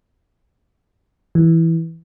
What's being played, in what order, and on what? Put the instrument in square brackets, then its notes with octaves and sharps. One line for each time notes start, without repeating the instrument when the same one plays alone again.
[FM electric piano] E3